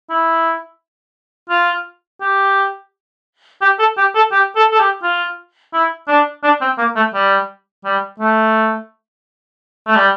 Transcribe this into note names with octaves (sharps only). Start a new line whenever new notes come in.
E4
F4
G4
G4
A4
G4
A4
G4
A4
A4
G4
F4
E4
D4
D4
C4
A#3
A3
G3
G3
A3
A3
G3